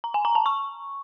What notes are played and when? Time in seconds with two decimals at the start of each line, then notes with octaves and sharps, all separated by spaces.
0.04 A#5
0.14 G#5
0.25 A#5
0.35 A5
0.46 C#6